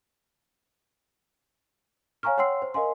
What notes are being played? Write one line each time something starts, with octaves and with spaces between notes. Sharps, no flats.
C#5 F5 G#5 A#5 C#6 F6
C#5 F#5 G5 C6 E6 C7
C5
A#4 D#5 F5 G#5 C6